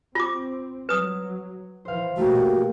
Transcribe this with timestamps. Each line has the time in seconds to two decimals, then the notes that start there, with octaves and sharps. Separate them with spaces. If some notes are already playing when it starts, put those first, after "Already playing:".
0.15 C4 F4 D6
0.89 F#3 B4 D#6
1.85 E3 C5 F5
2.17 B2 E3 A3 A#3 F#4 G4